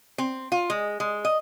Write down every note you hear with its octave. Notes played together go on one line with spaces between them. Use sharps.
C4
F4
G#3
G#3
D#5